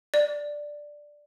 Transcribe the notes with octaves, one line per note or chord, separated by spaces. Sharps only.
D5